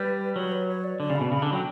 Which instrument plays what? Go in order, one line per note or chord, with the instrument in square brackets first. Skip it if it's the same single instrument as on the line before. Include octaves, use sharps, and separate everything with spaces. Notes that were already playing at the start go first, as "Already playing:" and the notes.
Already playing: [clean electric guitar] G3 [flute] B4
[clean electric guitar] F#3 [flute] C#5
[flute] B4
C#5
D5
[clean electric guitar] D3 [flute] D5
[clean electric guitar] C#3
[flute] B5
[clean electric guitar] B2
[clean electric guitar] C#3 [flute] B5
[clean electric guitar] D3 [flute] A5
[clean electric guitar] F#3 [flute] G5